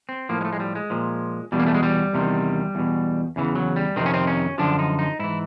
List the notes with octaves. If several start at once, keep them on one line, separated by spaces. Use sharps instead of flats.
C4
A2 F3 A#3
G#3
A3
G#3
G3
G#3
A#2 F3
E2 B2 G3
A#3
A3
G#3
G3
E2 C3 D#3
E2 B2
E2 C#3 E3
F#3
G3
F2 C3 D#3 C4
C#4
C4
C#4
F#2 D3 F3 D4
D#4
D#4
G#2 E3 E4